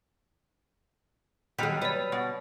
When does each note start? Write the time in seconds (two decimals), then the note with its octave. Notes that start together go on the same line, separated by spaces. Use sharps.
1.59 B2 D#3 F#3 G3 G#4 B6
1.82 B4 C#5 D5
2.12 B2